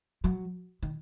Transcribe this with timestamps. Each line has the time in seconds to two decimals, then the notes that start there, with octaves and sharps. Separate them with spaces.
0.24 F#3
0.83 D#3